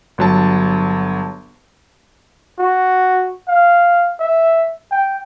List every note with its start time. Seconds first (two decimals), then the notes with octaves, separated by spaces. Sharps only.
0.18 G1 F#3 A5
2.59 F#4
3.48 F5
4.19 E5
4.91 G5